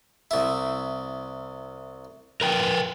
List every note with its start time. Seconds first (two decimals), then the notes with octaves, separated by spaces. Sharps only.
0.31 C2 E4
2.41 A#4 B4 G5